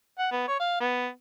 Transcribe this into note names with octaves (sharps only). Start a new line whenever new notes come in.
F#5
B3
C#5
F5
B3